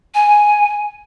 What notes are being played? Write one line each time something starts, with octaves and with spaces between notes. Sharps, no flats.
G#5